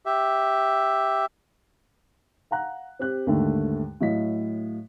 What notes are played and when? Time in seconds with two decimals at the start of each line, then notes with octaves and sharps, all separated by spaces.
0.06 G4 E5
2.51 F5 F#5 A#5 F#6
2.99 C4 G4 F#6
3.27 D#2 G#2 D3 A3
4.01 A2 F#3 D#5 F5 B6